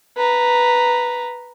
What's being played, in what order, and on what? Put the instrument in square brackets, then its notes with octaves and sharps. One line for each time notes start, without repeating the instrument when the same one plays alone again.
[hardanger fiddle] B4 A#5